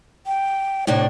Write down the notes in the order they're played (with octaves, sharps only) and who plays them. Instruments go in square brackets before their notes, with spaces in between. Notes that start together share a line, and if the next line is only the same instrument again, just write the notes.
[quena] G5
[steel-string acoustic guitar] A2 C3 D4 [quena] C#5